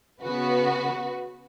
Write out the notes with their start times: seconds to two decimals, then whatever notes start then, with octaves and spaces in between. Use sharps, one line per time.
0.23 C#3 B3 F#4 B4